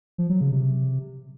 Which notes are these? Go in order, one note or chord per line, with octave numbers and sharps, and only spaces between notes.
F3
F#3
C#3
C3